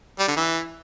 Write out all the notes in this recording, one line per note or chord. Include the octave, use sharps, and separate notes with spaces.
G3
D3
E3